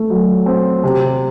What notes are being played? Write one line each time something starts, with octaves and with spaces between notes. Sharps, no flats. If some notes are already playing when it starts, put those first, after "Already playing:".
Already playing: A3
F#3
C4
C3